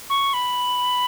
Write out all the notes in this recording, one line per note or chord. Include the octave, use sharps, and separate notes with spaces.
C#6
B5